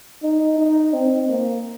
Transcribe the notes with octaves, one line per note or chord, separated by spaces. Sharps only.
D#4
D#4
C4
A#3